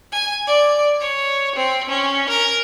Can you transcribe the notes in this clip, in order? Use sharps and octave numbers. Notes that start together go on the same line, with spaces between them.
G#5
D5
C#5
C4
C#4
A#4